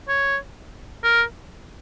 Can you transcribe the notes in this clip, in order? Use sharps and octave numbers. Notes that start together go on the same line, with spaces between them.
C#5
A#4